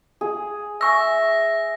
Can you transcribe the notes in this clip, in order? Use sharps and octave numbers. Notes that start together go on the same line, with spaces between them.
G#4
E5 G#5 C#6 E6 A#6